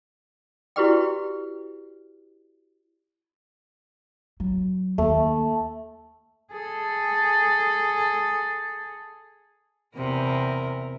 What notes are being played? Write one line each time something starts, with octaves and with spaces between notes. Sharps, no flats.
E4 F#4 G4 B4 D5 G5
F#3
D#2 A3
G#4 A4
E2 C3 A#4